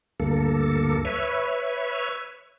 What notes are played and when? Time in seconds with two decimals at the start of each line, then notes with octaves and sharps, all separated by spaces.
0.20 D2 G2 A#3 A4
1.05 B4 C#5 E5